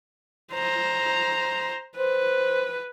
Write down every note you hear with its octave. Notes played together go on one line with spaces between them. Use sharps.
C5 A#5
B4 C5